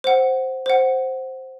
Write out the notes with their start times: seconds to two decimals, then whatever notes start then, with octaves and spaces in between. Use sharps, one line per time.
0.04 C5 F#5
0.66 C5 F#5